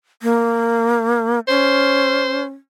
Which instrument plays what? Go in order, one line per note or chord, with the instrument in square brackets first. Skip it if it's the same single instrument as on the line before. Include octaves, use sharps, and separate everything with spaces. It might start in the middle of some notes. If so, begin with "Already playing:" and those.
[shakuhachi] A#3
[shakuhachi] C#4 [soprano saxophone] C5